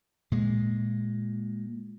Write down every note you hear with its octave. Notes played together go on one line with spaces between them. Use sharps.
A#2 G#3